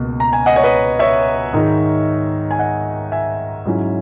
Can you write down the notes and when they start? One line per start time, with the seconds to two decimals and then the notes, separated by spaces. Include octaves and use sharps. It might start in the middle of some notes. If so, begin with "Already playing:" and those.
Already playing: C#2 B2 A#3
0.20 A#5
0.33 G#5
0.46 D#5 F#5
0.56 C#5
0.64 B4 D#5
0.99 C#5 E5
1.53 G#2 D#3 G#3 D#4
2.51 G#5
2.59 D#5 F#5
3.12 E5 G#5
3.65 G#2 F#3 C#4 E4